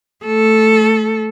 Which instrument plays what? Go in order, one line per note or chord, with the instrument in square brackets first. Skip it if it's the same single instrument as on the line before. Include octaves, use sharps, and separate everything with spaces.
[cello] A3 A4